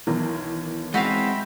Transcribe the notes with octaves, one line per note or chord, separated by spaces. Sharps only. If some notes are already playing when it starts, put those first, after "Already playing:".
B1 D#3 E3
G#3 C4 F#4 B4 E5 F5 G5 B5